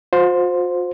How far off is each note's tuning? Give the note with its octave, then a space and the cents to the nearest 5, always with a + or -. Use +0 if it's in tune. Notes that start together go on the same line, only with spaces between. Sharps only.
F4 +45 C5 +0